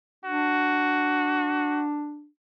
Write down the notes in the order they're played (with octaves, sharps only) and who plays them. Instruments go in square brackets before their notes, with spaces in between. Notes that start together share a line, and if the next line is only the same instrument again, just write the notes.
[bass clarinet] D4 [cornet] F#4